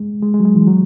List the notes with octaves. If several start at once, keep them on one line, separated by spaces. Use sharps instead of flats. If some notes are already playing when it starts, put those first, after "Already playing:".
Already playing: G#3
G#3
G#3
F#3
G#3
E3
F#3